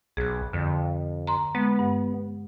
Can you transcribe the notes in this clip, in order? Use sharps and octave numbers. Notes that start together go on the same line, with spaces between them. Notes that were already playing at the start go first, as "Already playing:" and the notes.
B1 G#4 F#6
F2 D3
A#5 C6
G#3 B3
G2